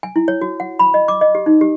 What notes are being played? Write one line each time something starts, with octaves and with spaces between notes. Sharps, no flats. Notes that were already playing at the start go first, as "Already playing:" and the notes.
G#5
E4
C#5
F#4
F#5
B5
D#5
D6
D#5
G4
D#4
G4